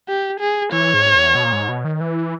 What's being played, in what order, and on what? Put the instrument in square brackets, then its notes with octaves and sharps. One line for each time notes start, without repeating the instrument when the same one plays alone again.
[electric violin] G4
G#4
[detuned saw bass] E3 [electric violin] C#5
[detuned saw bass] G#2
E2
B2
A#2
G#2
B2
D#3
E3